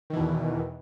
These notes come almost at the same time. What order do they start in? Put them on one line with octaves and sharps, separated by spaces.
D#3 E3 B2 E2